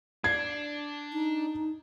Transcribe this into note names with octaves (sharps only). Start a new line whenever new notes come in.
D4 G#6 C7
D#4